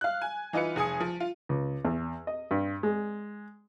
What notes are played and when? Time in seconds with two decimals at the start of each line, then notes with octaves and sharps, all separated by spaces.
0.01 F5 F#6
0.21 G#5
0.53 E3 D#4 F4 B4 C#7
0.76 F1 G#4 G#5 D#6 C#7
1.00 F3
1.20 F4
1.49 C#2
1.85 E2
2.27 D#5
2.51 G2
2.83 G#3